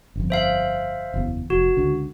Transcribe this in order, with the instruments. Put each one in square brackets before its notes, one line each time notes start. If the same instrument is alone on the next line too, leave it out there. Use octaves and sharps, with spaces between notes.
[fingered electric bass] G1 F2
[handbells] C5 E5 F5
[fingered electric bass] F#1 E2
[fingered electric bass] F1 [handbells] F#4
[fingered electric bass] C#2 D3